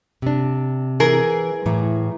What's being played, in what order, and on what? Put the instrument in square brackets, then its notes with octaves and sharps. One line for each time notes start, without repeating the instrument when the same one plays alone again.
[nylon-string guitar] C3 D4
[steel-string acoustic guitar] E3 [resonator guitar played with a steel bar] G#4 A#4
[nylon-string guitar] A2 [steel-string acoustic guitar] E3 A#5